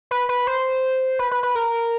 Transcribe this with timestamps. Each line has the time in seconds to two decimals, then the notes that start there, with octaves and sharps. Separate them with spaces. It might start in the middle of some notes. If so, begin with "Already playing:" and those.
0.11 B4
0.29 B4
0.47 C5
1.19 B4
1.31 B4
1.43 B4
1.55 A#4